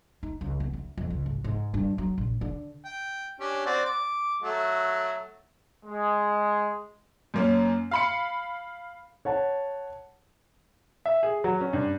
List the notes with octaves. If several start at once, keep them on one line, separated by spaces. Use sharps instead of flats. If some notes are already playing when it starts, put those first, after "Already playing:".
D#4
C#2
B3
D2
F2
C#2
G#1
G#2
G2
F#3
A#1
D3
G5
C#4 D4 G4
C4 F#4 D5
D6
F#3 A3 F#4
G#3
F#2 A#3 C#4
F5 B5 C#7
C#5 F#5 A5
E5
G#4
F#3
C#4
G2